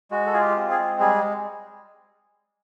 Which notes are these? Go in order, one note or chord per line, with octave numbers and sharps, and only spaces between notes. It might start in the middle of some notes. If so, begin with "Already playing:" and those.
G#3 F#4
A4
F4 G#4
G4
C4
G#4
G#3
G3 G#4